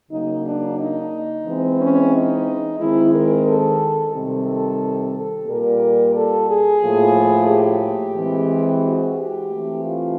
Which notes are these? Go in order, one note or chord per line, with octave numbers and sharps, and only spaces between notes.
C#3 F#3 A#3 D#4
D4
D#4
E3 G#3 C4
C#4
D#4
D#3 G#3 C4 E4
A#4
A4
C3 D#3 G3 C4
A4
A4
A#2 G3 A#3 A#4
A4
G#4
A2 F3 A#3
G4
E3 G#3 C4
F#4
G4
E3 A3 C4
F4